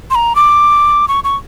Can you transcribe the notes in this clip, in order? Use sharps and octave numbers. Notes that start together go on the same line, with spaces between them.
C6
A#5
D6
C#6
C#6